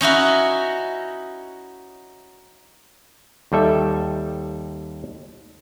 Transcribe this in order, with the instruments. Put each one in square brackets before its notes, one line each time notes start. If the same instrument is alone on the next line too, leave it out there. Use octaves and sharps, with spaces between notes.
[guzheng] C#4 D#4 E4 F#4
[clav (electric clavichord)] D#2 G3 A4 E5